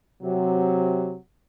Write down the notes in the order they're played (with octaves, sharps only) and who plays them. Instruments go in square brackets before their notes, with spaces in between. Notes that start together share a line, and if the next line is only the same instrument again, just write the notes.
[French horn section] C3 F#3